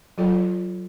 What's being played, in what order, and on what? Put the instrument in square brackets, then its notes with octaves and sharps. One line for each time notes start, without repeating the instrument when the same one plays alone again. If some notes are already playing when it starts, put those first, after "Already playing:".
[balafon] F#3 F4 A4 C#5 G5